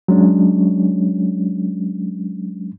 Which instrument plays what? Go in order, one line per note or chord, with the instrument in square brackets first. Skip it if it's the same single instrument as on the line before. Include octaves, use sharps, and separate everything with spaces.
[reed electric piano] F#3 G#3 C#4 D4